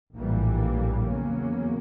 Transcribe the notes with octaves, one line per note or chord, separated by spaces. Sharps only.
A#1 A2 E3 G3 A#3
E2 C#3 F#3 A#3 C#4